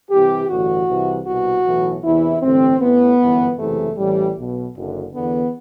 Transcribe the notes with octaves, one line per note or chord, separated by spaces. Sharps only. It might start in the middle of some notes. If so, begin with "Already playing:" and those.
C2 C3 E3 G4
A1 G2 D3 F#4
C2 C3 E3
C2 B2 F#4
B1 A2 E3
E2 C3 E3 E4
A1 G2 D3 C4
A1 A2 E3 B3
G1 F#2 E3
F#1 E2 C3 E3 A3
A1 A2 E3 G3
B1 B2
F#1 F#2 D3
E2 D3 B3